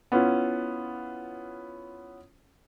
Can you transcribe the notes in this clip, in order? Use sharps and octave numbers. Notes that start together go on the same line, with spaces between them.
B3 C#4 E4 F4